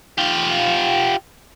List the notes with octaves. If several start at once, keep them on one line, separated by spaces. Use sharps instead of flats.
F4 G4